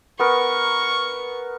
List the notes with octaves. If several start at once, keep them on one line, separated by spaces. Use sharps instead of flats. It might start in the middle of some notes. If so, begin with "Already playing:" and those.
B3 A#4 C#6